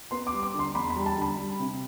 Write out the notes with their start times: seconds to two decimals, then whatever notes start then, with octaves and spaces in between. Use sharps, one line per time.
0.11 B3 C6
0.27 D6
0.33 G3
0.43 D6
0.54 D3
0.59 C6
0.75 E2 B5
0.90 B5
0.96 G3
1.06 A5
1.17 D3 B5
1.38 G3
1.60 C3